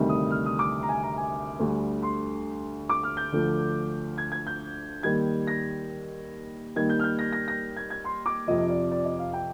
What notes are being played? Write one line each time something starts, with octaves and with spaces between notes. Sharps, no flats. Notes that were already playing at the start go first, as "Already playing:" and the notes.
Already playing: D2 C3 D#3 G3
D#6
F6
D#6
D6
A#5
G#5
A#5
G#5
D2 D3 G3
C6
D6
F6
G6
D2 D3 F3
G#6
G#6
G6
D#2 D#3 G3 G#6
A#6
D#2 D#3 G3 G#6
G6
F6
G6
A#6
A#6
A#6
G#6
G#6
C6
D6
F2 C3 F3 D#5
D5
D5
D#5
F5
G5